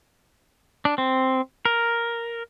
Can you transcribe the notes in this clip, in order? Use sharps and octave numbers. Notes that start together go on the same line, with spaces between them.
D4
C4
A#4